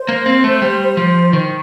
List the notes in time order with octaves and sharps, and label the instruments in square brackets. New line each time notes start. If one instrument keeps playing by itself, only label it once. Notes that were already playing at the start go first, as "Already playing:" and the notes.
Already playing: [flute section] C5
[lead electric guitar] A#3
C4
A3
G3
F3
[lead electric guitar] D#3 [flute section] C5